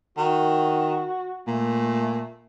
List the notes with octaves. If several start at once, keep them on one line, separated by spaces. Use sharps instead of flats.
D#3 F#4
A#2 A3